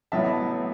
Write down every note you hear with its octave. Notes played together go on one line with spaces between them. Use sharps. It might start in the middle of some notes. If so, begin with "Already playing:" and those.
A1 A2 F#3 B3 E5 A5